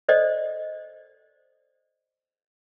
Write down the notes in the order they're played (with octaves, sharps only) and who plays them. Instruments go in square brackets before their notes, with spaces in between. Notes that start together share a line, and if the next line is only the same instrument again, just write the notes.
[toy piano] A4 C5 D5 D#5